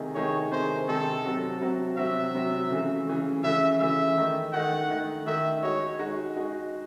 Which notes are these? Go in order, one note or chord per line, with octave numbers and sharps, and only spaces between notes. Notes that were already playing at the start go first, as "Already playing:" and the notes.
Already playing: C3 D#3 A3 D#4 G#4
C3 D#3 A3 D#4 G#4 C#5
C3 D#3 A3 D#4 G#4 C5
C3 D#3 A3 D#4 G#4 A4
C3 F#3 C4 F#4
C3 F#3 C4 F#4
C3 F#3 C4 F#4 E5
C3 F#3 C4 F#4
C#3 E3 A3
C#3 E3 A3
C#3 E3 A3 E5
C#3 E3 A3 E5
D#3 A3 D#4
D#3 A3 D#4 F#5
D#3 A3 D#4
D#3 A3 D#4 E5
G#3 D#4 F#4 C#5
G#3 D#4 F#4
G#3 D#4 F#4